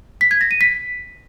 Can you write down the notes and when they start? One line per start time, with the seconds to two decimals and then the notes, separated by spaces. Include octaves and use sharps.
0.21 B6
0.31 G#6
0.41 A#6
0.51 D#7
0.61 B6